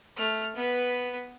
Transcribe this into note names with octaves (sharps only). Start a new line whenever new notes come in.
A3 F6
B3 B4